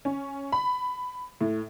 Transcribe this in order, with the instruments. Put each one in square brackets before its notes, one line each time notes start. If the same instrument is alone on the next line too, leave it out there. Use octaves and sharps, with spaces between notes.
[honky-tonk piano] C#4
B5
A2